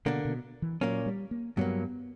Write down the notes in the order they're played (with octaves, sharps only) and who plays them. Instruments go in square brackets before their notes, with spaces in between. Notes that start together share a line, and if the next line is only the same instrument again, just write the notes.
[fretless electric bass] B2 [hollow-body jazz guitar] D3 A#3 D4
[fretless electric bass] B2
E3
[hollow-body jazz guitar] A#2 A#3 C#4 [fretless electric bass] F#3
[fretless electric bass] G3
A#3
[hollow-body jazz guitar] G2 F#3 A#3 [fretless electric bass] B3